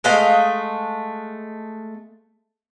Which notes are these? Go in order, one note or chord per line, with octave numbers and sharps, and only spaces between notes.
G#3 A3 D#5 F5